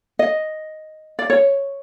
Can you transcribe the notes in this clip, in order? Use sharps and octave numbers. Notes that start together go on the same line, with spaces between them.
D#5
D5
C#5